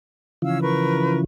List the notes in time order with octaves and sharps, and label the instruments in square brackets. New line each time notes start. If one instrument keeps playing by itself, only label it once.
[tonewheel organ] C#3 E3 F3 [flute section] C#4 F5 E6
[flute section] A#4 B4 C#6